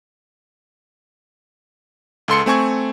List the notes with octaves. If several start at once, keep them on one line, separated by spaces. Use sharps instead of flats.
C#2 A4 C6 C#7
A3 C4 G#5 C#6 G#6